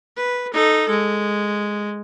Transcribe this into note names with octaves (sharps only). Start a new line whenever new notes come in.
B4
D#4 A4
G#3